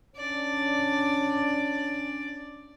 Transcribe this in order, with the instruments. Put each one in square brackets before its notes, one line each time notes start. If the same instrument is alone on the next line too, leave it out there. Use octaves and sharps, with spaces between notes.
[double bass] C#4 D4 [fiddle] D5